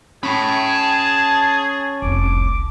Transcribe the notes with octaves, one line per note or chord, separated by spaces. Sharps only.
C#4 G#4 A5 B5
F1 C2 D6